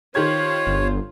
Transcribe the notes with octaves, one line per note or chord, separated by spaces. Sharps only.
D#3 F4 G4 C5 C#5 G#6
G1